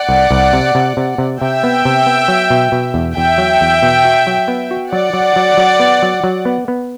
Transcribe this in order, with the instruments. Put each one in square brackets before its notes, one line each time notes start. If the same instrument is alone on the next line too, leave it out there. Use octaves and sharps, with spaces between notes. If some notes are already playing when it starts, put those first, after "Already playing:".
Already playing: [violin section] D5 F#5
[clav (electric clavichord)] C2
C2
C3
C3
C3
C3
[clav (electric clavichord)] C3 [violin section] E5 G5
[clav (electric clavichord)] B3
C3
B3
F#3
B2
B2
E2
[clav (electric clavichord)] E2 [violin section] E5 G5
[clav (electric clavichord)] F#3
E2
B2
F#4
F#3
B3
F#4
[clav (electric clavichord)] F#3 [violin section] D5 F#5
[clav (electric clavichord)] F#3
F#3
F#3
B3
F#3
F#3
B3
B3